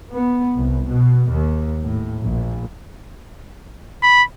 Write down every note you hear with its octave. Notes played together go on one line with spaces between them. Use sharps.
B3
C2
B2
D#2
A2
A#1
B5